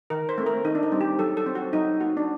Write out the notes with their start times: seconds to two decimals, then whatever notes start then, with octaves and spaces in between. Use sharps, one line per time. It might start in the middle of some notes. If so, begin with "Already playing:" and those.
0.10 D#3 A#4
0.29 C5
0.38 A3 C4
0.47 A#4
0.65 D#3 D#4
0.75 D4
0.83 D#4
0.92 G3 C4
1.01 G4
1.19 F#3 A4
1.37 A4
1.46 C4
1.55 F#4
1.73 F#3 D#4
2.00 A#3 F#4
2.17 D4